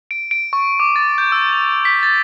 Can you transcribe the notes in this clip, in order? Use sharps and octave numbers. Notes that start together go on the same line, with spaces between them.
D7
D7
C#6
D6
A6
G6
E6
F7
B6
A6